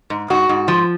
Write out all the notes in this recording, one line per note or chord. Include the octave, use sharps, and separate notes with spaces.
G#2
G#2 F#4
G#2
F3